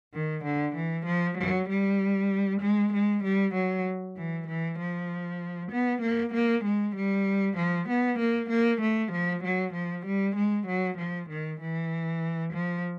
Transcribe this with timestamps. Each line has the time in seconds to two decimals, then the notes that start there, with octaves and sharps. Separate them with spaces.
0.14 D#3
0.44 D3
0.75 E3
1.06 F3
1.38 F#3
1.69 G3
2.61 G#3
2.93 G#3
3.24 G3
3.54 F#3
4.17 E3
4.47 E3
4.79 F3
5.71 B3
6.02 A#3
6.34 A#3
6.65 G#3
6.96 G3
7.57 F3
7.89 B3
8.19 A#3
8.50 A#3
8.81 A3
9.12 F3
9.44 F#3
9.74 F3
10.06 G3
10.36 G#3
10.67 F#3
10.98 F3
11.30 D#3
11.61 E3
12.53 F3